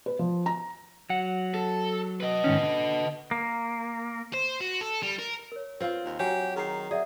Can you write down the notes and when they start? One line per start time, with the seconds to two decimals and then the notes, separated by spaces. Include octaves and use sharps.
0.06 B4
0.19 F3
0.46 A#5
1.10 F#3 F#5
1.54 A4
2.20 B4 D#5
2.44 G#2 D#3 C#4
2.63 D3
3.31 A#3
4.34 C5
4.61 F#4
4.81 A4
5.03 G3
5.19 A#4
5.52 A#4 C#5
5.80 C4 F4
6.05 D#2
6.19 F#3 G4 G#5
6.56 D#3 G#4 A#5 C7
6.91 G#4 D5 E5 F#5